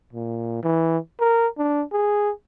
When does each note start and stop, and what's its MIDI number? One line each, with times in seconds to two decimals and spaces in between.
0.13 0.63 46
0.63 0.98 52
1.20 1.47 70
1.58 1.83 62
1.92 2.31 68